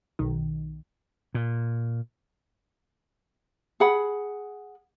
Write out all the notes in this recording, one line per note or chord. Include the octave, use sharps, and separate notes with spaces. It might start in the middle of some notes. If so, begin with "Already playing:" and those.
B1 D#3
A#2
G#4 F#5 B5